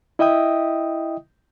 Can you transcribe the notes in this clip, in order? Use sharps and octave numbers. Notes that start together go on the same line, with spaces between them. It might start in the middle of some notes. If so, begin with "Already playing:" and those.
E4 D#5 E5 G5 D#6